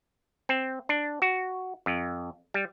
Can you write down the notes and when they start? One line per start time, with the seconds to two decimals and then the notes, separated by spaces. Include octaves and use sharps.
0.49 C4
0.89 D4
1.22 F#4
1.86 F2
2.54 G3